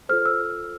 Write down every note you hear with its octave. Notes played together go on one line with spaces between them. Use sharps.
F4 A4 C5 F6
E6